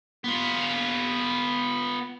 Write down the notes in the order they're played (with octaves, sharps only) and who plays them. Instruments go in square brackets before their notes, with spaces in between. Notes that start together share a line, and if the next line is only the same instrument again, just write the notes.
[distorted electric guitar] B3 F4